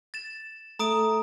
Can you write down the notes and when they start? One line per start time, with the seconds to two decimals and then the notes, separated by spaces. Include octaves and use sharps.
0.14 A6 E7
0.79 A3 A#5 D#6 D7